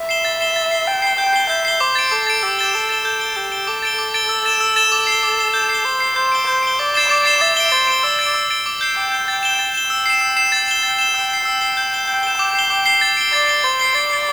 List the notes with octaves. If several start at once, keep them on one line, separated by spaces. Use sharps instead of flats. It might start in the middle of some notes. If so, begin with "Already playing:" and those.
Already playing: E5
C7 E7 G7
A6
C7 E7 G7
A6
C7 G7
G5 A6
C7 G7
G5 G6
C7 G7
E5 G6
C7 G7
C5 D6
A6 D7
A4 D6
A6 D7
G4 E6
A6 E7 G7
A4 E6
A6 E7 G7
A4 G6
D7 G7
G4 G6
D7 G7
A4 D6
A6 D7 G7
A4 D6
A6 D7 G7
E6
A6 E7 G7
E6
A6 E7 G7
A4 D6
C7
G7
D6
C7 G7
G6
C7 G7
C5 G6
C7 G7
C5 G6
D7 G7
C5 G6
D7 G7
D5 D6
A6 C7 E7 G7
D5 D6
A6 C7 E7 G7
E5 A6
D7 G7
C5 A6
D7 G7
D5 E6
A6 D7 G7
E6
A6 D7 G7
D6
G6 C7 G7
G5 D6
G6 C7 G7
G5 A6
E7 G7
A6
E7 G7
G5 E6
C7 E7
E6
C7 E7
A6
E7 G7
G5 A6
E7 G7
G5 E6
C7 G7
G5 E6
C7 G7
G6
E7 G7
G5 G6
E7 G7
G5 D6
C7 G7
G5 D6
C7 G7
A6
D7 G7
D5 A6
D7 G7
C5 A6
C7 G7
D5 A6
C7 G7